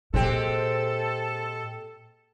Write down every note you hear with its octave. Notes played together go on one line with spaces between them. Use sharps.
A#2 G#3 C4 G4 A4